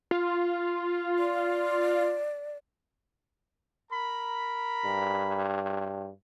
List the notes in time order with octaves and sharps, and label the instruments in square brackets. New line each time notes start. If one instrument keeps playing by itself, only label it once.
[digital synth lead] F4
[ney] D5
[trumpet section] A#4 A#5 B5
[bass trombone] G2